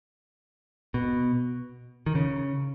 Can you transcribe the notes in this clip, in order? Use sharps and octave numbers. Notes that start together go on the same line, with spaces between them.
B2
D#3
C#3